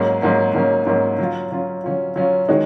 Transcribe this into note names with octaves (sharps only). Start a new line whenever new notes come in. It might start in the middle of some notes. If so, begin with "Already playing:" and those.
Already playing: G#2 F#3 A#3 C#4
G#2 F#3 A#3 C#4
G#2 F#3 A#3 C#4
G#2 F#3 A#3 C#4
F#3 C#4 F4
F#3 C#4 F4
F#3 C#4 F4
F#3 C#4 F4
D#3 G#3 D#4 F#4 C#5